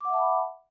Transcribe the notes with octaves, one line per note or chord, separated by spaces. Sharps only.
E5 F#5 A5 B5 D6